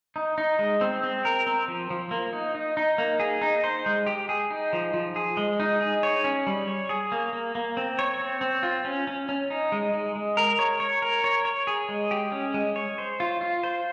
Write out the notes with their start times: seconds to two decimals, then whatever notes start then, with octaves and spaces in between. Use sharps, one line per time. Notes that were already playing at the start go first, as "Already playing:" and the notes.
0.16 D#4
0.38 D#4
0.59 G#3
0.81 C4
1.03 C4
1.25 A#4
1.47 C4
1.68 F3
1.90 F3
2.11 A#3
2.33 D#4
2.55 D#4
2.77 D#4
2.98 A#3
3.20 G#4
3.42 D#4
3.64 C5
3.86 G#3
4.06 G4
4.29 G#4
4.50 D#4
4.73 F3
4.94 F3
5.16 G#4
5.37 G#3
5.60 D#4
5.81 G#4
6.03 C#5
6.24 C#4
6.47 G3
6.68 C#5
6.89 G#4
7.12 A#3
7.33 A#3
7.55 A#3
7.77 C4
7.99 C#5
8.20 C4
8.41 C4
8.63 F4
8.85 C#4
9.07 C#4
9.29 C#4
9.50 D#4
9.72 G#3
9.94 G#3
10.16 G#3
10.37 A#4
10.59 C#5
10.80 C#5
11.02 A#4
11.24 C#5
11.45 C#5
11.67 G#4
11.89 G#3
12.11 G4
12.32 C#4
12.54 G#3
12.76 C#5
12.98 C5
13.20 F4
13.41 F4
13.63 C5